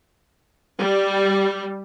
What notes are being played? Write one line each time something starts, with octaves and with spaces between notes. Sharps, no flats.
G3